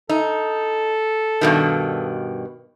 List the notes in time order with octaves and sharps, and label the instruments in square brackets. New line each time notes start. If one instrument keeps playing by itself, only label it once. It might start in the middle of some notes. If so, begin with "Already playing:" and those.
[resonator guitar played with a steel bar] D#4 [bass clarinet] A4
[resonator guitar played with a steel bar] G2 B2 D#3